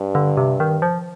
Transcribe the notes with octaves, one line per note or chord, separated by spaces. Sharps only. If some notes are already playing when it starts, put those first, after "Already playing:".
Already playing: G2
D3
C3
D#3
F3